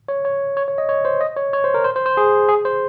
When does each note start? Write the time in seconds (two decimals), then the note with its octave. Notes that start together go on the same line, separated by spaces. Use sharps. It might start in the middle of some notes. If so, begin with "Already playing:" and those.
0.08 C#5
0.25 C#5
0.57 C#5
0.68 C#5
0.78 D#5
0.89 C#5
1.05 C5
1.21 D#5
1.36 C#5
1.53 C#5
1.64 C5
1.74 A#4
1.84 C5
1.96 C5
2.06 C5
2.17 G#4
2.49 G#4
2.65 C5